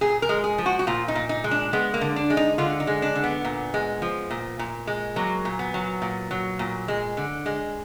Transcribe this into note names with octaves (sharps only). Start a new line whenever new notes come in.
A#2 G#4
A#4
G#3
G#4
F3
F#4
F#4
A#2 F4
D#4
A#2
D#4
G#3
D4
G#3 B3
A#3
D3
D4
G#3
D#4
D3 F4
D#4
G#3
D4
D3
B3
A#2
G#3
F3
A#2
A#2
G#3
F#3 A#3
A#2
B3
F#3
A#2
F#3
A#2
G#3
D3
G#3